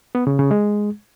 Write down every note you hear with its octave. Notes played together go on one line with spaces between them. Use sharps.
B3
C#3
C#3
G#3